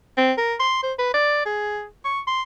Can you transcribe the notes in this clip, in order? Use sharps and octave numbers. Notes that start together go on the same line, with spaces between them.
C4
A#4
C6
C5
B4
D5
G#4
C#6
C6